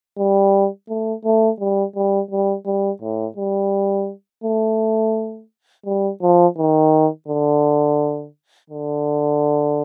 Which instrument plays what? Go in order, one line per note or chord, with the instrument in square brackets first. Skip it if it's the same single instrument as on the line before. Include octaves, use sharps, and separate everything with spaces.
[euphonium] G3
A3
A3
G3
G3
G3
G3
A2
G3
A3
G3
F3
D#3
D3
D3